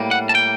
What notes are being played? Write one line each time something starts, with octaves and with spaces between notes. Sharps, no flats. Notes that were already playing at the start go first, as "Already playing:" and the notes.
Already playing: A2 G3 A#3
F#5
A5
G5